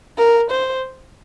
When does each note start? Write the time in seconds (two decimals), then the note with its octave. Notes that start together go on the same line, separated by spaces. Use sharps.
0.19 A#4
0.51 C5